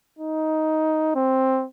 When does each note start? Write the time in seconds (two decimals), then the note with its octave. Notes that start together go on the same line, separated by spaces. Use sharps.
0.19 D#4
1.15 C4